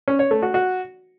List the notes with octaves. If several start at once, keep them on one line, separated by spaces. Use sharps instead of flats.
C#4
C#5
A3
F#4
F#4